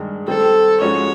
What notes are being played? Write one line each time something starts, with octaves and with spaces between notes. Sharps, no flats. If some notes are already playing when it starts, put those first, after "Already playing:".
Already playing: G2 D#3 G#3
D#3 G3 C4 A4
G#2 F3 G#3 C#4 F#4 C#5